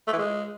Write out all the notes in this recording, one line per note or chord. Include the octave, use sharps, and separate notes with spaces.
A3
E3
G#3